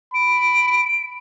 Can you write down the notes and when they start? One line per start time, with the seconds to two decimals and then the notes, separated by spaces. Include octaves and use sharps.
0.14 B5 D7